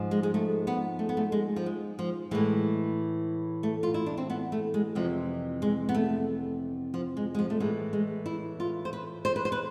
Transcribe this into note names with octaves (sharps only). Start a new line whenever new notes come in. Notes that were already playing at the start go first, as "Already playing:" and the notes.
Already playing: G#2 F3
G#3
G#3
A3
B3
A3
B3
A3
G#3
F3
G#3
F3
A2 E3 G#3
A3
F4
E4
D4
C4
B3
A3
G#3
F2 C3 E3 F3
G#3
B3
A3
F3
G#3
G#3
F3
A3
A2 E3 G#3
G#3
E4
F4
C5
B4
C5
B4
C5
B4